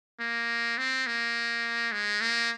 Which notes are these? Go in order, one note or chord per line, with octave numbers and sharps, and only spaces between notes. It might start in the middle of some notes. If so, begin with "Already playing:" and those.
A#3
C4
A#3
G#3
A#3